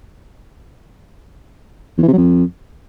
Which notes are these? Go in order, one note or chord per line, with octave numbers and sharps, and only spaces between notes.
E2
E3
C3
F#3
F2